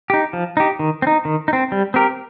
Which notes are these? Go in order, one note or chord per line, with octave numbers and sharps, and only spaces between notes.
D#4 G4
F3
D#4 G4
D#3
C4
D#4
D#3
D#4
C4
G3
C4 G4 A#4